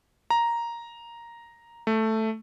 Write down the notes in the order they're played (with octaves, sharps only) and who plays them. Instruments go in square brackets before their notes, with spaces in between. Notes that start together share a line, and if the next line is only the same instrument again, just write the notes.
[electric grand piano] A#5
A3